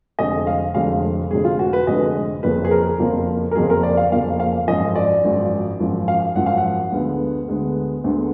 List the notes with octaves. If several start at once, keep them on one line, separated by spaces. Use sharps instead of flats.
F1 F2 D3 G#3 D#5
F5
F1 F2 D3 G#3 F5
F1 F2 D3 G#3 G#4
F4
F#4
B4
F1 F2 D3 G#3 D#5
F#1 F2 F3 A#3 B4
G#4
A#4
F#1 F2 F3 A#3
A#4
F#1 F2 F3 A#3 G#4
A#4
D5
F5
F#1 F2 F3 A#3 F5
F5
G#1 F#2 F3 D#5
D5
G#1 F#2 F3
G#1 F#2 F3
F5
G#1 F#2 F3 F#5
F5
F#5
D2 D3 G#3 B3
D2 D3 G#3 B3
D2 D3 G#3 B3